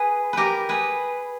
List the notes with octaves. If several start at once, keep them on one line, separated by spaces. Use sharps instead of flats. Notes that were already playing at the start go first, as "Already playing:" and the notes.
Already playing: G#4 B4
G4 A#4 B4
G#4 B4